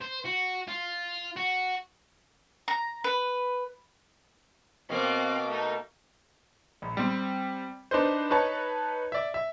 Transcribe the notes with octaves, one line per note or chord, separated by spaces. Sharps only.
C5
F#4
F4
F#4
A#5
B4
B2 A#3 C4 F5 D6
A3 D#4
A#1
G3 C4
D4 D#4 B4 C5
D#4 B4 C#5 A5
D5 E5
E5